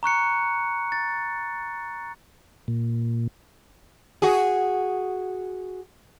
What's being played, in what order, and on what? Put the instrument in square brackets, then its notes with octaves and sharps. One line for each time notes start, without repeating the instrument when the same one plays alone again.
[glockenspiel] A#5 C#6 F#6 C#7
A6
[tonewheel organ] A#2
[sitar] F#4 G#4